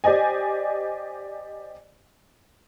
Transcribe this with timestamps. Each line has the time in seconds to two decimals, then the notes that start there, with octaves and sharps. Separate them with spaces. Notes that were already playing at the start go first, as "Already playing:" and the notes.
0.04 G4 C5 D5 D#5 G#5